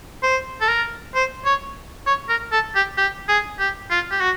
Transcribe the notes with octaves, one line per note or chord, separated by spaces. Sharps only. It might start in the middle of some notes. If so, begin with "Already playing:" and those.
C5
A4
A#4
C5
C#5
C#5
A#4
A4
G4
G4
G#4
G4
F4
G4
F#4